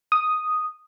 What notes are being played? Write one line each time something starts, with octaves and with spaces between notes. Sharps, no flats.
D#6